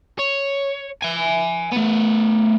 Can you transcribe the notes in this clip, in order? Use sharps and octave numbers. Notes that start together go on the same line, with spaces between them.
C#5
E5 G#5
A3 B3